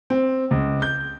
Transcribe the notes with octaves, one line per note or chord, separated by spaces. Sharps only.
C4
C#2
G6